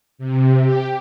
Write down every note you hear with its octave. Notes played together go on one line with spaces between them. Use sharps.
C3
G4